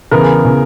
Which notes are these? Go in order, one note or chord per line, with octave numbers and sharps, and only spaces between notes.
E2 C#3 E3 B3 A#4
C#3 E3 B3